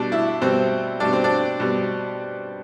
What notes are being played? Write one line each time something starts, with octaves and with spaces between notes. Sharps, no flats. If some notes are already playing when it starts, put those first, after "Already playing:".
Already playing: B2 G3 D4
E4
B2 G3 C4
B2 G3 D4
C4
D4
B2 G3